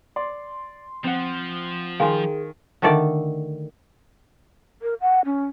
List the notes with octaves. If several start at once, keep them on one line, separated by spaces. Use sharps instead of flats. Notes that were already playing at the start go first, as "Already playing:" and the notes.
D5 C6
F3 C4 F#5
D#3 G#4 F5 G#5 C6
D3 D#3 A3 A4 D5
A#4
F#5
C#4